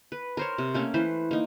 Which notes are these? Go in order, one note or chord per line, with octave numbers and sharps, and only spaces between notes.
B4
A#4 C5 C#5
C3
A3 A#3 C#4
E3 B4 C5
A#3 D#4